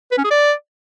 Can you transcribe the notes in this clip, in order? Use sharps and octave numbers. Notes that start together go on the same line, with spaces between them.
B4
C#4
G#4
D5